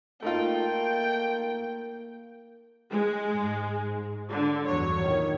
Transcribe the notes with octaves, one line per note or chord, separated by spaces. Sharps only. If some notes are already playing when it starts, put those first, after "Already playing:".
A3 A#3 D#4 F4 G5
G#3
G#2
D3
E2 G2 F#3 C#5
A#2 D#3